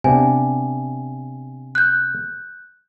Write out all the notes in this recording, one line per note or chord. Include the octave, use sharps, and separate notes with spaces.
C3 B3 D4 G#5
F#6 G6